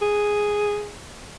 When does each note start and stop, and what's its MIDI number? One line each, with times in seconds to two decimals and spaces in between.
0.02 0.90 68